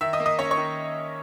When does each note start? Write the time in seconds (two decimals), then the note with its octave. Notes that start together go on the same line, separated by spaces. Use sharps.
0.01 D#3 E5 E6
0.13 D#5 D#6
0.20 A#3
0.26 D#5 D#6
0.39 C#4 C#5 C#6
0.51 C#5 C#6
0.57 D#3